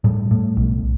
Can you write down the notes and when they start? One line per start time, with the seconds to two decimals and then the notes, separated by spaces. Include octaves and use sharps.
0.04 A2 G3
0.31 A2
0.57 B1